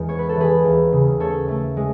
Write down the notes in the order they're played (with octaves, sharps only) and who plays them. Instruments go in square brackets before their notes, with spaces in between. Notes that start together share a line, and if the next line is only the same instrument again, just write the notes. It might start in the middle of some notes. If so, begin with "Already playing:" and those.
Already playing: [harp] E2 G#3
B3 C#5
B4
A4
E3 G#4 B4
D#2
C#3
A3 A4 C#5
A3
G#3